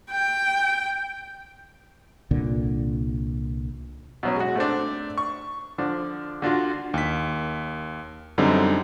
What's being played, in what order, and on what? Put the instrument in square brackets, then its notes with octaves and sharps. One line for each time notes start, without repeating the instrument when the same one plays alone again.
[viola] G5
[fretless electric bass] C2 A#2 D3
[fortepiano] B2 F#3 C#4
G#3 F#4
A3 C4 D4
C#6
D3 F3 D4
D3 D4 F4 F#4
[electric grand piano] D#2 B6
F#2 D3 G3 C4 D#4